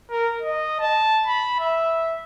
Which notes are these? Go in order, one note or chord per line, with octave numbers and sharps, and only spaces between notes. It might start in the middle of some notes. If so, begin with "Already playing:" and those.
A#4
D#5
A5
B5
E5